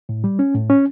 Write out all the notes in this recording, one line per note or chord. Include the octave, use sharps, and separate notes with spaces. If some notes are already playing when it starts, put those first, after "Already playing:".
A2
G3
C#4
A2
C#4